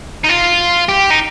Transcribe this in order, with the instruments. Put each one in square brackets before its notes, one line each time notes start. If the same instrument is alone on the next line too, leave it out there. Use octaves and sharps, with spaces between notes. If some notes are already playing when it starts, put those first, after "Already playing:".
[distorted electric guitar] D#4
F4
G4
D#4